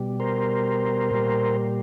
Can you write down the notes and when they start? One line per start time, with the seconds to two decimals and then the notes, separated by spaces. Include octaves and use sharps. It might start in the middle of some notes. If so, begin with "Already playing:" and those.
Already playing: B2 G3
0.20 A#4 C5
1.11 A#2 G3